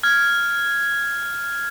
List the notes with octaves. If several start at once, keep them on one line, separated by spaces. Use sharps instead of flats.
F6 G#6